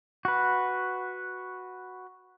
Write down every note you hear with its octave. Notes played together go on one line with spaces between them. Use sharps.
F#4 B4